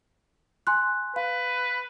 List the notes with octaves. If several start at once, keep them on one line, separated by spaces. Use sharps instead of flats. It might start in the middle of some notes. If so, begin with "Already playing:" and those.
G#5 C6 F#6
B4 F5